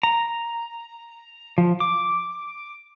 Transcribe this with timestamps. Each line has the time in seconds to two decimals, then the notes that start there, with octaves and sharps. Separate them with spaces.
0.03 A#5
1.58 F3
1.80 D6